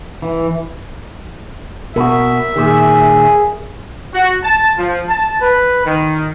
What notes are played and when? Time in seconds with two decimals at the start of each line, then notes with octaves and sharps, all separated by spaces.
0.22 E3
1.96 B2 F#4 A#4 E5
2.56 A#2 D#3 G#4
4.13 F#4
4.42 A5
4.76 F3
5.08 A5
5.40 B4
5.84 D#3